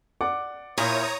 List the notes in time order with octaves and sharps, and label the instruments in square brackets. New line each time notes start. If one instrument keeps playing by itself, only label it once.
[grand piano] D5 F#5 D6
[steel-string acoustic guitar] A#2 G#5 [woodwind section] E4 A#4 C5 [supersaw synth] C#5 A#5 D#6